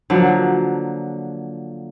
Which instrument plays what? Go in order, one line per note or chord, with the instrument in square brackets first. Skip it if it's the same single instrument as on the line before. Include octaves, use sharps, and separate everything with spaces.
[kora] D3 F3 F#3 A#3